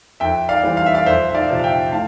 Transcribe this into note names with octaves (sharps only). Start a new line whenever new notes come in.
F2 E5 G5
D5 F5
E3 G3 C4
F5
E5
D5 F5
F2 C5 E5
E5
D5 F5
C3 F3
F5
E5 G5
A2 F5 A5